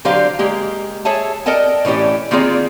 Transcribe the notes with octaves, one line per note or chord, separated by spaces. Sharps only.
D3 F#3 G4 C5 D5 F5
G#3 A#3 G4
G#4 A4 C#5 E5 G#5 A5
A4 A#4 D5 D#5 G5 A5
A2 E3 C#4 D#4 G4 D5
D#3 A#3 C4 F4 G#4 D5